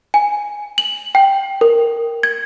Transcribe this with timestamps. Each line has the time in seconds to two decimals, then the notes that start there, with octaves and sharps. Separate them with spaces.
0.14 G#5
0.78 F#7
1.15 G5
1.61 A#4
2.23 G#6